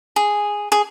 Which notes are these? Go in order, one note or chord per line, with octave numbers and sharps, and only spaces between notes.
G#4
G#4